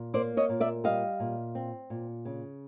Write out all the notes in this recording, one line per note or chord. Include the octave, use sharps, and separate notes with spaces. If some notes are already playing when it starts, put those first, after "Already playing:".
Already playing: A#2
A#3 C5 D5
C#5 D#5
A#2
D5 E5
G3 D#5 F5
A#2
C4
A#2
C#3